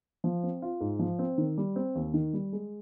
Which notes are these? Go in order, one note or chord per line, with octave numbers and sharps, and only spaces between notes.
F3
C4
F4
G#2
F3
C4
D#3
G3
C4
D#2
D#3
G3
G#3